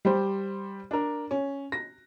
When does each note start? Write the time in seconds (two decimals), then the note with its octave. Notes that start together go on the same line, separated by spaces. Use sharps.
0.05 G3 G4 C5
0.91 D4 A#4
1.31 C#4
1.72 A#6